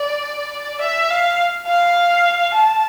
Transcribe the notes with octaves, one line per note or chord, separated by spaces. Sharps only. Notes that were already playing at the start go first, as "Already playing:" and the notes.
Already playing: D5
E5
F5
F5
A5